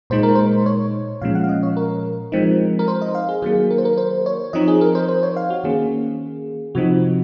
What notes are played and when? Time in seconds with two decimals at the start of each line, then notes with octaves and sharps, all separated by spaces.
0.10 A#2 G#3 D#4 C5
0.23 A#4
0.35 C5
0.66 C#5
1.21 A#2 F3 G#3 C#4 F5
1.35 F#5
1.43 F5
1.49 D#5
1.63 C#5
1.77 A#4
2.32 F3 G#3 C4 D#4
2.79 A#4
2.88 C5
3.02 D#5
3.15 F5
3.29 G#4
3.42 D#3 F#3 A#3 G#4
3.71 A#4
3.78 C5
3.85 A#4
3.98 C5
4.26 C#5
4.53 F3 C4 D#4 D#5
4.68 G#4
4.81 A#4
4.95 C5
5.09 C5
5.23 C#5
5.36 F5
5.50 F#4
5.64 D#3 A#3 C#4 G#4
6.75 C3 F3 C4 D#4 F#4